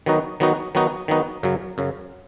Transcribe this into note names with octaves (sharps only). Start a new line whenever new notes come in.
D#3 F#3 B3 D#4 F#4
D#3 F#3 B3 D#4 F#4
D#3 F#3 B3 D#4 F#4
D#3 F#3 B3 D#4 F#4
F#2 C#3 F#3
F#2 C#3 F#3